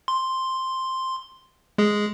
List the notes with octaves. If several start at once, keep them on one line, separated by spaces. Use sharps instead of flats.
C6
G#3 G#4